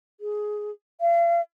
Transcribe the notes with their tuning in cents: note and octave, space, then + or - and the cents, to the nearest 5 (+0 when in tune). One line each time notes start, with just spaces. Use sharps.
G#4 +10
F5 -40